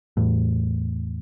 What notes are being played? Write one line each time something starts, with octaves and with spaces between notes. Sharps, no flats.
E2 A2